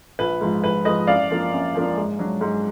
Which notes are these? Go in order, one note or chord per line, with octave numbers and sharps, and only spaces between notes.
A#1 B4
G#2 F3
A#1 B4
G#2 F3 B4 D#5
F#2 D5 F5
F3 A#3 D4
F#2
F3 A#3 D4
G#2
F#3 D4
G#2